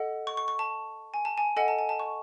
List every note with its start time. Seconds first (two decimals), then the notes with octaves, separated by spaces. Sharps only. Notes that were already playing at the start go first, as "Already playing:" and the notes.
Already playing: A4 D#5 F#5
0.27 C#6
0.37 C#6
0.48 C#6
0.59 A5
1.14 G#5
1.25 A5
1.38 G#5
1.56 A4 D#5 F#5 G#5
1.68 A5
1.79 G#5
1.89 A5
1.99 C#6